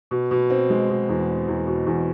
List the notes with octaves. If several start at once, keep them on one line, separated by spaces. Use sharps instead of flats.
B2
B2
C4
G#3
B2
E2
C4
E2
B2
E2